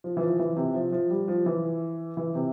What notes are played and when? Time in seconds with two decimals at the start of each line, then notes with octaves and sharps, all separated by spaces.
0.04 F3
0.17 E3
0.21 F3
0.39 E3
0.57 C3
0.74 F3
0.92 F3
1.10 G3
1.28 F3
1.46 E3
2.17 E3
2.35 C3